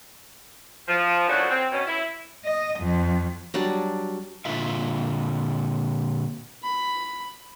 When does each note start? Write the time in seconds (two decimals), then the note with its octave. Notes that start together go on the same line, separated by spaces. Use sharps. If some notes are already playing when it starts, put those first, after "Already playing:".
0.88 F3
1.28 F#2 A2 F3 F#3 D4 F#4
1.50 C4
1.72 B2 C#4
1.87 E4
2.45 D#5
2.79 F2
3.54 F#3 G3 D4
4.45 A#2 D3 F4 E5 F5
6.63 B5